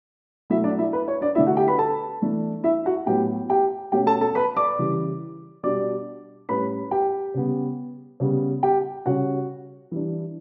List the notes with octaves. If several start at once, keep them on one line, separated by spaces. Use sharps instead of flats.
B2 F#3 A3 E4 E5
D4 D5
E4 E5
B4
C#5
D4 D5
D3 A3 D4 E4 E5
F#4 F#5
G4 G5
B4 B5
A4 A5
E3 A3 D4
E4 E5
F#4 F#5
A2 F#3 B3 G4 G5
G4 G5
B2 A3 C#4 G4 G5
A4 A5
A4 A5
B4 B5
D5 D6
C#3 E3 G3
B2 G3 D4 D5 D6
A2 G3 C#4 B4 B5
G4 G5
C#3 G3 B3
C#3 G3 B3
G4 G5
C#3 G3 C#4 F#4 F#5
E3 G3 D4